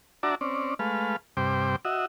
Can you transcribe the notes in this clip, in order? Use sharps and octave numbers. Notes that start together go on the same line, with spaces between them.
D4 F#4 D5 E5 A5 A#5
C4 C#4 D5
G#3 A3 B4 F5
G2 C3 C5 G5 D6
F#4 D#5 E5